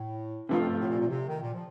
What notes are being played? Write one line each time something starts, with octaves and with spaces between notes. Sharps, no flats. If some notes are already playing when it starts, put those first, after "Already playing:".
Already playing: A2
G2 C3 F3 A3 C4 F4
F2
G2
A2
A#2
A#2
C3
D#3
A#2
F3